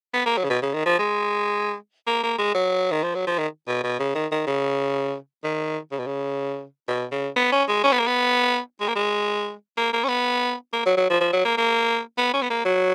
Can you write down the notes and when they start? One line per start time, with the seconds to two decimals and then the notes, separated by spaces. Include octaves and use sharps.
0.13 B3
0.26 A#3
0.37 F#3
0.44 C#3
0.50 B2
0.62 C#3
0.73 D#3
0.85 F3
0.98 G#3
2.07 A#3
2.23 A#3
2.38 G#3
2.54 F#3
2.91 D#3
3.03 F3
3.15 F#3
3.27 F3
3.38 D#3
3.67 B2
3.83 B2
3.99 C#3
4.15 D#3
4.31 D#3
4.47 C#3
5.43 D#3
5.91 C#3
5.99 B2
6.06 C#3
6.88 B2
7.11 C#3
7.36 B3
7.52 C#4
7.68 G#3
7.84 C#4
7.92 B3
7.99 A#3
8.07 B3
8.80 G#3
8.88 A#3
8.95 G#3
9.77 A#3
9.93 A#3
10.04 C#4
10.08 B3
10.73 A#3
10.85 F#3
10.97 F#3
11.09 F3
11.20 F3
11.33 F#3
11.45 A#3
11.57 A#3
12.17 B3
12.33 C#4
12.42 B3
12.50 A#3
12.65 F#3